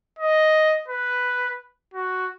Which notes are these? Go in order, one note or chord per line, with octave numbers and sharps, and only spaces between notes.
D#5
B4
F#4